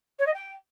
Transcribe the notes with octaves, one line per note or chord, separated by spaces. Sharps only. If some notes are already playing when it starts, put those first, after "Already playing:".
C#5
D#5
G5